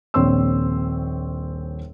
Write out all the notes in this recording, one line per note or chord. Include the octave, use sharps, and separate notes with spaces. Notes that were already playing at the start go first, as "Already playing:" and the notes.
D#1 A#1 C4 C#5 C6 E6